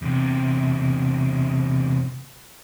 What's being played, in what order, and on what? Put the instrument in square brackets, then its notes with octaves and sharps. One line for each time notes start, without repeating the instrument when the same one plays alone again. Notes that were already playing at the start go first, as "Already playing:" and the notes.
[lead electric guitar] E2 C3